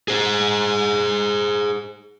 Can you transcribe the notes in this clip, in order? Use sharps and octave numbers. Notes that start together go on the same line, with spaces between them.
G#4 C5